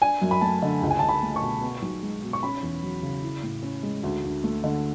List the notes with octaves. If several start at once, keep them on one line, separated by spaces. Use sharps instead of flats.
D4 G#5
F#2
B5
A3 A5
D3
C#2
G#5
C#2 A5
B5
A3
C#6
B2
B3
B1
G#3
B2
C#6
C#4 B5
E2
F#3
C#3
E4
A2
C#4
G#3
D2
D2
A3
D3